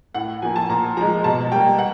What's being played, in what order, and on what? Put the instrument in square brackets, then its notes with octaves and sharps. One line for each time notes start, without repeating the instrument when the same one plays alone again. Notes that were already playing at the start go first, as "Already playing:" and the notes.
[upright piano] A2 F#5
F3 A#3 G#5
A5
A#2 A#5
F3 G#3 A#5
B2 A5
G3 A#3 G5
F#5